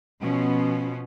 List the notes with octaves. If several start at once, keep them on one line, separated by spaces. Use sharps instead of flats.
B2 F3 B3 C#4